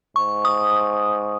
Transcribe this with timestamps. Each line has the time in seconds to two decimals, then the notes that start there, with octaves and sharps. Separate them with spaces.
0.16 G#2 C#6
0.45 D#6